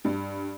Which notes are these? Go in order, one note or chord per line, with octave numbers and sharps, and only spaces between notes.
G2